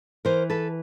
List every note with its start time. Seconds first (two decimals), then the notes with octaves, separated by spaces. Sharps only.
0.25 E3 A#4 C5
0.50 A4 B4